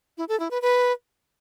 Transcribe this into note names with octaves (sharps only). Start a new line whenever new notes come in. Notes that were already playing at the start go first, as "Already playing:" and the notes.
E4
A4
E4
B4
B4